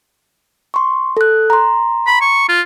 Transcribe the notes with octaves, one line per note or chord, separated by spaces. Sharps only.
C6 C#6
A4 F#6
A#5 C6
B5
C#6
F4